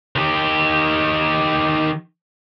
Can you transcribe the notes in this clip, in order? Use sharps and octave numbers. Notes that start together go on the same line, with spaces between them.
D#3 G4